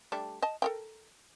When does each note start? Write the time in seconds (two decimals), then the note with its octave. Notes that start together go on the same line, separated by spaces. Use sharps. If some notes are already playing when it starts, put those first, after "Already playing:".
0.12 G3 A3 D4
0.42 D#5 A5
0.62 A4 A#4 G5